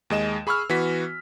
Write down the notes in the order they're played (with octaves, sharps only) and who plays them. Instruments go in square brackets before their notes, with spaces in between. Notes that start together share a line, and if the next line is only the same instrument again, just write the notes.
[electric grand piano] D#2 G#3 D#5 E7
G#4 B5 C#6 E6 F6
E3 B3 F#4 B6